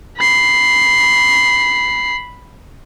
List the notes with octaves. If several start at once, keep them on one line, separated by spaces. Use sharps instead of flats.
B5 C7